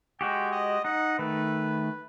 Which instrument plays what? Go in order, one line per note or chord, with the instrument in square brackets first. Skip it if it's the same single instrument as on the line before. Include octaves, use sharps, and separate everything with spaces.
[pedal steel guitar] G#3 F#4 G4 [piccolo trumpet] G5
[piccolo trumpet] D#5
[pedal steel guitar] D#4 [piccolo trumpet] F#5
[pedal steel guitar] D#3 A3 [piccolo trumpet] B4